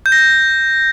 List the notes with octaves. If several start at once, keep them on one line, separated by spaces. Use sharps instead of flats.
G6
A#6
G6